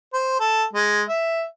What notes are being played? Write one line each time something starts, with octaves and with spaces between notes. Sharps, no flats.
C5
A4
G#3
E5